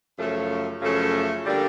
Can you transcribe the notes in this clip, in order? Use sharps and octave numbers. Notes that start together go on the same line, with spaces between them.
F#2 C#3 F3 A3 C#4
F#2 C#3 F3 A3 C#4
D3 G3 A#3 D4 G4